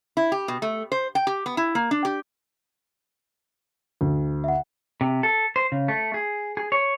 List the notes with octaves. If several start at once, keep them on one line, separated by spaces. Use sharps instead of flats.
E4
G4
B2
A3
C5
G5
G4
B3
E4
A#3
D4
G4
D2
E5 F#5
C3
A4
C5
C#3
A3
G#4
G#4
C#5